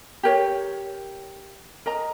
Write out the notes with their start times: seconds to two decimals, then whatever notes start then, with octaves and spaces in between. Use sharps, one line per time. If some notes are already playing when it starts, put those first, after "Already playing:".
0.23 G4 A#4 C#5
1.86 A#4 D#5 A#5